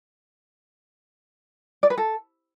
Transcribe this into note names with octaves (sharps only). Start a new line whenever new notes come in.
D5
B4
A4